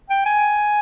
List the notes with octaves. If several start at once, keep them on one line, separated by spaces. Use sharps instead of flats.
G5
G#5